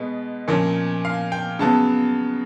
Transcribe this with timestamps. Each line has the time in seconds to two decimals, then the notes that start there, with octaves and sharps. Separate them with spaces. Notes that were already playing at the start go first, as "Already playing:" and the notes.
Already playing: B2 G#3 B3
0.48 A#2 F3 A#3 C#4
1.05 F5
1.32 G5
1.59 C#3 F#3 B3 A5